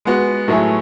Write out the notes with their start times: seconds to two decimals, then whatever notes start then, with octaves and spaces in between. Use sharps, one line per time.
0.05 G#3 B3 F#4
0.48 A2 F#3 A3 E4 G#4